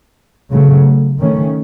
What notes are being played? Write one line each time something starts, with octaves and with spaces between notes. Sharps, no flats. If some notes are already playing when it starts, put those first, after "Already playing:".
C#3 F#3 A3
D#3 A3 C#4